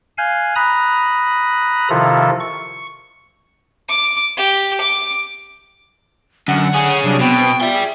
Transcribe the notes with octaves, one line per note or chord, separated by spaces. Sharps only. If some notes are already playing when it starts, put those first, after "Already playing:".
F5 G#5 F#6 G6
A#5 B5 D#6 F#6
C3 D#3 F3 E4 F4 A4
C#6
D6
G4
D6
F#2 D3 F#5
C#4 G#4
C3 F#3 G3 D4
B2 B3 C4 G5
F4 G4 D5 E5 G5
G#4